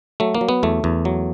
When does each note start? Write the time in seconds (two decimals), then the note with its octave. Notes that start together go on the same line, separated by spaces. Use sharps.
0.20 F#3 A3
0.35 A#3
0.41 F#3
0.49 B3
0.63 E2 A3
0.84 E2
1.05 F#3